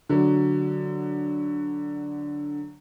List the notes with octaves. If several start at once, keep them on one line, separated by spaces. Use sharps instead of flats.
D3 F#3